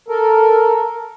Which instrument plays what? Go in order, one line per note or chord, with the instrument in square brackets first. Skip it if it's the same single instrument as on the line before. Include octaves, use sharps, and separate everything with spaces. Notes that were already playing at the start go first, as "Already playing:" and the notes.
[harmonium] A4 A#4